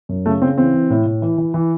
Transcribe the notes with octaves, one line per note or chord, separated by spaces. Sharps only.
F#2
C#3 A3
C#3 C4
E3 C4
E3
A2
A2
E3
E3
E3